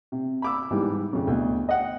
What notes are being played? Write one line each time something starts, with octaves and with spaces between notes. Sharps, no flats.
C3
B5 D6 E6
G#2 E3 G3
F2 C#3
D2 B2
D#5 F#5 G5